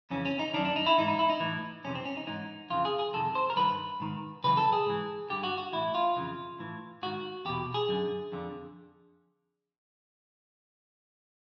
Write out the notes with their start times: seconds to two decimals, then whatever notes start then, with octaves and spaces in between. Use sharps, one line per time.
0.10 F2 C#3 E3 C#4
0.25 C#4
0.39 D#4
0.54 D#3 D4
0.57 F#2
0.65 D4
0.76 D#4
0.86 E4
0.98 G#2 E3 D#4
1.08 D#4
1.19 E4
1.30 D#4
1.40 A2 E3
1.84 F2 C3 E3 C#4
1.95 C4
2.05 C#4
2.17 D#4
2.27 G#2 E3 D#4
2.70 F2 C#3 E3 F4
2.85 G#4
2.99 G#4
3.13 F2 C3 D#3 A4
3.35 C5
3.50 A#4
3.56 G2 D#3 B4
4.00 G#2 D#3
4.44 F#2 C#3 E3 B4
4.57 A4
4.73 G#4
4.86 G#2 E3
5.30 G2 D3 G4
5.43 F#4
5.58 F#4
5.73 A2 E3 E4
5.95 F4
6.16 F2 C#3 E3
6.59 A2 E3
7.02 G#2 D#3 F#4
7.45 E2 B2 G4
7.74 G#4
7.88 F#2 D3
8.32 F2 D3